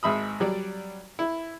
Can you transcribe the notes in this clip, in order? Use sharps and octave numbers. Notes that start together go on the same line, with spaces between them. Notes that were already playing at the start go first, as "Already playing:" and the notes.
G#1 G#2 E5 B5 D#6
F#3 G3 D5
E4